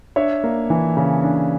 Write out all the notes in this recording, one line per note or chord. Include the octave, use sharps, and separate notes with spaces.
D4 C#5 E5
A#3
E3
C#3
D4